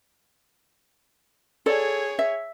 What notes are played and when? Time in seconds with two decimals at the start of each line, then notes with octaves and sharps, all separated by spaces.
1.66 G#4 A4 C#5 D5
2.19 E5